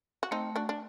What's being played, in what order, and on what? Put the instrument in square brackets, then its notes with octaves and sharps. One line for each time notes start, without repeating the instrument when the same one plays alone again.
[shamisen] F#4
[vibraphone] A3 [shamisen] C4 D#4
[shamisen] D4 F#4
D4